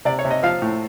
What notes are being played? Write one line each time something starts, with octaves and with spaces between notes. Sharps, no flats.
C3 D5
C#5
C3
D#5
F3 F5
A2